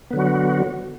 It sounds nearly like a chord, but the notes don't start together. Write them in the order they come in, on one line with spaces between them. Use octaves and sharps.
B3 D3 F#3 F#4